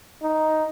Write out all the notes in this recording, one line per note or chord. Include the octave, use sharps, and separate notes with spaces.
D#4